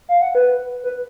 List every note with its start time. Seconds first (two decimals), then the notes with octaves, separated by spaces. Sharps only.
0.09 F5
0.21 F#5
0.35 B4
0.84 B4